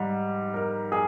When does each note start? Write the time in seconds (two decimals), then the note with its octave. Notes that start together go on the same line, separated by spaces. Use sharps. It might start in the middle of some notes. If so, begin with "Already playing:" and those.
Already playing: G#2 G3
0.54 A#4
0.92 G#4